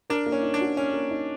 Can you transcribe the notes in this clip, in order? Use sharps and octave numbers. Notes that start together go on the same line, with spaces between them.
D4 A#4
A#3
C#4
D#4
D4
F#4
C#4 A#4
A#3
D#4